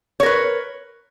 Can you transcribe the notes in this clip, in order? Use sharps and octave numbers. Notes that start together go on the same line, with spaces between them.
A#4 B4 C#5